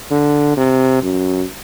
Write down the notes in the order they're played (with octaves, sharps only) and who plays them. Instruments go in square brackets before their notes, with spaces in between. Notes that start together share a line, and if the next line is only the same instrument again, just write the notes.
[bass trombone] D3
C3
F#2